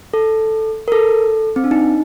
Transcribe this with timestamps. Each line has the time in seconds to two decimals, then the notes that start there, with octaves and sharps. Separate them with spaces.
0.14 A4
0.88 A#4
0.92 A4
1.56 C4
1.64 D4
1.71 D#4